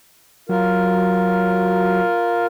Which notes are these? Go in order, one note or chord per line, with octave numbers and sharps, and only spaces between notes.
F#3 F4 A#4